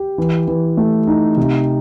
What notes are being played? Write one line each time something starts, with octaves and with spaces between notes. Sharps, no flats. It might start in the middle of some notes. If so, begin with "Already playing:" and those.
Already playing: G4
E3
E3
A3
D#4
C3